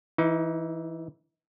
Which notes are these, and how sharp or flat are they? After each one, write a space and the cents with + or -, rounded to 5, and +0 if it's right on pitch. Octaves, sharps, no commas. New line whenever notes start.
E3 +0 D#4 +30